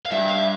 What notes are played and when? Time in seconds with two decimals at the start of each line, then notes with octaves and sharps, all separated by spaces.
0.06 F5
0.11 G2 E5
0.29 F5
0.38 E5